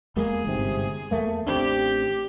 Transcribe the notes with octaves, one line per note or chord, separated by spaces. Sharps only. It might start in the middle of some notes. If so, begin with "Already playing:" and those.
E2 G#3 A#3 G#4
G1 G#2 C3
E2 A3 A#3
A1 C4 D4 G4